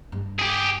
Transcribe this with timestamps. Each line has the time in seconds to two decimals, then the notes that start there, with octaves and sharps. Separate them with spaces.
0.12 G2
0.39 G4 G#4